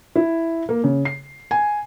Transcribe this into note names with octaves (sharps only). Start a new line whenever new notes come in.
E4
A#3
C#3
C7
G#5